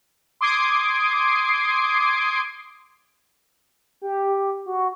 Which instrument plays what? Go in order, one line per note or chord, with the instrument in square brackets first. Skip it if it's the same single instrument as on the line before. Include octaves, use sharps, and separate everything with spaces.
[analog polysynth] C6 D6 D#6 G#6 C7 D7
[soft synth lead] G4
F#4